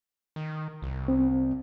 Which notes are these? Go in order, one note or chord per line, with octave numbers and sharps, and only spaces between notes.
D#3
C2
C4